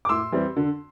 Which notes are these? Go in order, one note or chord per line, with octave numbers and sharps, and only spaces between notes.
D6
A2 C6 E6
E3 G3 C4
D3